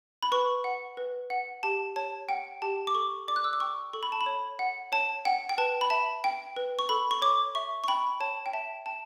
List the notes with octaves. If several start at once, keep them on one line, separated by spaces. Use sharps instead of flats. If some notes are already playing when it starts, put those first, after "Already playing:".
B5
B4 C#6
F#5
B4
F#5
G4 A5
C#5 A5
F#5 G5
G4 A5
D6
A4 C#6
D5 D6
F#6
E6
D6
G5 C#6
A4 C#6
B5
A5
B5
C#5
F#5
C#5 A5
F#5 G5
G5
B4 A5
B5
E5 A5
G5
B4
C#6
A4 B5
C#6
C#5 D6
E5 C#6
C#6
G5 B5
C#5 A5
G5
E5 A5
G5 A5